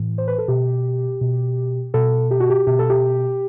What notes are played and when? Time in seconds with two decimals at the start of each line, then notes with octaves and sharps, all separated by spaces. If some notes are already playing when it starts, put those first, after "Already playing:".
Already playing: A2 E3
0.18 C5
0.28 B4
0.38 A4
0.48 B2 G4
1.21 B2
1.94 B2 A4
2.31 G4
2.40 F#4
2.50 G4
2.67 B2 G4
2.79 A4
2.90 G4